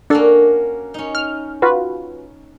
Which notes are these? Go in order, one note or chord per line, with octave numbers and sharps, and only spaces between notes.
A#3 C#4 D4 F#4 A4
C#4 D#4
F6
F4 F#4 B4